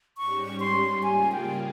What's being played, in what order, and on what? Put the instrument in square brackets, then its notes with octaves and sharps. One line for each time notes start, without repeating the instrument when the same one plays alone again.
[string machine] G#2 G3 C#4 G4 [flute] C#6
[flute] C6
[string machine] C#3 G3 A#3 F4 G#4 [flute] G#5
[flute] G5